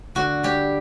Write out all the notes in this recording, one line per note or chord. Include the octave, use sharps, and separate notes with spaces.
D3 F#4
G3 G4